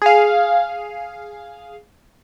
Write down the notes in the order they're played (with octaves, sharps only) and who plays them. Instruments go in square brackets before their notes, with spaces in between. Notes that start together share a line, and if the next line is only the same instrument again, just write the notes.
[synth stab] G#4 F5